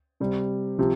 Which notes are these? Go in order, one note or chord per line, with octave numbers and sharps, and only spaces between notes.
C3 G3
C3 F3